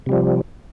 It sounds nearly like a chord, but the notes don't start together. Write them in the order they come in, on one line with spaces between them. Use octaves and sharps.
C3 G3 F3